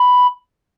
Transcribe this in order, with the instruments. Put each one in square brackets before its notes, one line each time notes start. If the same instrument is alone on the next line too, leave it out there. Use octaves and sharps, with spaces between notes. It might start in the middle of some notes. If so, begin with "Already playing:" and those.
Already playing: [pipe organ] B5